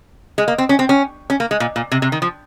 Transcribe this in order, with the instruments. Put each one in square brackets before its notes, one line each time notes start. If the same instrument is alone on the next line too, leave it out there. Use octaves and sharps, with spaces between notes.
[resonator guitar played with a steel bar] G#3
A#3
C4
C#4
C4
C#4
C#4
A#3
G#3
A#2
A#2
C3
C3
D#3
F3